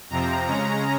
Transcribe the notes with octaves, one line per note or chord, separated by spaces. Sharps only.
F2 C3 F3 C4 A#5
C#3 G#3 C#4 A#5